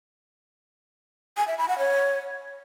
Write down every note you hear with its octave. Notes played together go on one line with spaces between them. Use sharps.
G#5
E5
B5
F#5
C#5